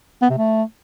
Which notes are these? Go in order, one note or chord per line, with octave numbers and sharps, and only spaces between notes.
B3
C3
A3